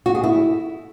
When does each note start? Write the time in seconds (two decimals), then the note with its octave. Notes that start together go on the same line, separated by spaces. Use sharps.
0.06 F#4
0.15 G#4
0.24 E4